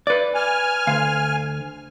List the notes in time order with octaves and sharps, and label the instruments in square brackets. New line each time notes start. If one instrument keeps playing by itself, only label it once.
[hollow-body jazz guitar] B4 D5
[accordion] G#5 F6
[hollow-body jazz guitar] D2 F5